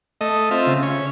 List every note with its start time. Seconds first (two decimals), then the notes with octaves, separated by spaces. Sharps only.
0.21 A3 D#5
0.51 C4 F4 E5
0.67 C#3
0.83 C#4